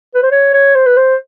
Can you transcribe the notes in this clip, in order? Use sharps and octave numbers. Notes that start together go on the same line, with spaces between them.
B4
C5
C#5
C#5
C5
B4
C5